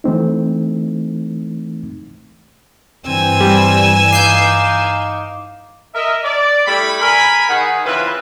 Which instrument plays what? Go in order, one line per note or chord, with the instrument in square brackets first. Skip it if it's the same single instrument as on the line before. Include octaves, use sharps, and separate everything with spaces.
[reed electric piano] E3 A3 C4 D#4
[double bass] G2 E3 [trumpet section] C4 [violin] G#5 E6
[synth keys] G3
[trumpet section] D#4 F5 D6 [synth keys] G6 C7
[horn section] A#4 D#5 E5
D5
G3 A3 E4 B5
A#4 G#5 B5
D#3 G#4 F#5
C#3 E3 C4 F4 B4